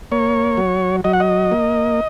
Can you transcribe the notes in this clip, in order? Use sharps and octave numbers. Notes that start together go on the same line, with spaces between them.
A#3 C#5
F#3
F#3 D#5
F#5
D#5
A#3